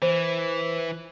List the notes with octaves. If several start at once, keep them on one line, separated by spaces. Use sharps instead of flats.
E3 C5